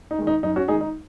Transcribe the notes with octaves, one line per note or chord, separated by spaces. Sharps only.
D#4
D#3 G#3
D#4
F#2 D#4
C#4 F#4
D#3 G#3 D#4 G#4
D#4